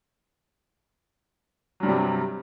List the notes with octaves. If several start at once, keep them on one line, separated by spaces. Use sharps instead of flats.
G2 C3 F#3 G3